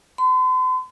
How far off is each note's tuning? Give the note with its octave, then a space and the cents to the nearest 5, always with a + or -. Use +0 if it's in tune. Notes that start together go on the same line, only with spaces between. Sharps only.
C6 -45